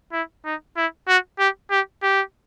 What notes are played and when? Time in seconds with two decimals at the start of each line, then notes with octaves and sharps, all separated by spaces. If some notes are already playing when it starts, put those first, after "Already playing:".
0.12 E4
0.45 D#4
0.77 E4
1.08 F#4
1.39 G4
1.71 G4
2.02 G4